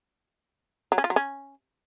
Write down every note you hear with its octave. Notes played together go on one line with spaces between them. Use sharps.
F#3
C#4
F4
F#3
C#4